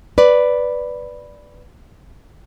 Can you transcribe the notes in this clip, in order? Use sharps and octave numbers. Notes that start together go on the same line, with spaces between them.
B4 D5